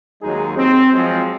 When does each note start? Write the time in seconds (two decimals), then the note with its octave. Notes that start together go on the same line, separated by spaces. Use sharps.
0.22 D#2 F#3 G#3 D#4 G#4
0.57 C4
0.92 F3 F#3 G#3 C4